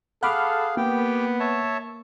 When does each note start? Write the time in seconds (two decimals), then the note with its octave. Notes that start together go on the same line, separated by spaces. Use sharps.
0.23 G#4 A4 F5 F#5 B5 D6 F6 F#6
0.77 A#3 B3 G4 G5
1.40 C#5 E5 A5